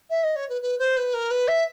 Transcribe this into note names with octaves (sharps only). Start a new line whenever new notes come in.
E5
D#5
C#5
B4
B4
C5
B4
A#4
B4
E5